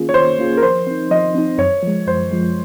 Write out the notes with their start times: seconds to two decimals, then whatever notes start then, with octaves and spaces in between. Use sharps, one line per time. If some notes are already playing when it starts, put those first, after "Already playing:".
Already playing: D#3 A#3 C#4 F4 G#4
0.09 C#5
0.14 D#3 C5
0.39 A#3 C#4 F4 G#4
0.57 A#4
0.62 F3 C5
0.87 C4 D#4
1.11 F3 D#5
1.35 C4 D#4
1.58 F#2 C#5
1.83 F3 G#3
2.07 F#2 C5
2.31 F3 G#3